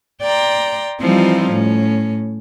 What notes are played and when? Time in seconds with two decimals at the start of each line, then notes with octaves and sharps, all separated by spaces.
0.23 D5 G5 A#5 C6
1.01 E3 F3 G3 C4 D#4 F4
1.52 A2 C#4